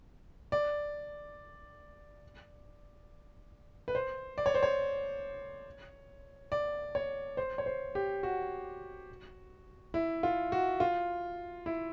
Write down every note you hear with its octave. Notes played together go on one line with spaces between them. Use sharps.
D5
B4
C5
D5
C#5
C5
C#5
D5
C#5
C5
C#5
C5
G4
F#4
E4
F4
F#4
F4
E4